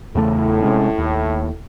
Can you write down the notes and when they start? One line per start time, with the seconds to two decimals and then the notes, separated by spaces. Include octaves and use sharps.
0.15 E2 A2 C#3 A3
0.62 C3 G#3 C#4
0.98 D#2